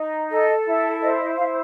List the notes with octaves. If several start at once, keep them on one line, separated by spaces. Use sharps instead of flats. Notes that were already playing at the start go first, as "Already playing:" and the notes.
Already playing: D#4
A4 D#5
E4
C5 D#5
D#5
E4 F5